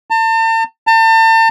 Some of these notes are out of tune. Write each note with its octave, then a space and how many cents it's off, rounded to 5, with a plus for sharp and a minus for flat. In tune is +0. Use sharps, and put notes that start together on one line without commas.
A5 +40
A5 +40